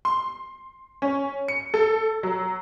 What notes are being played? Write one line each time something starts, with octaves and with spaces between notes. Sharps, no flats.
C6
C#4
C#7
A4
F#3